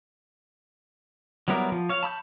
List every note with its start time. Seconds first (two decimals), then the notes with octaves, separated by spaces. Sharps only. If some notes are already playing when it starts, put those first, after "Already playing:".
1.48 F#3 G3 B3 E4 A#4
1.72 F3
1.89 C#5 F5
2.03 A5 B5 E6 G6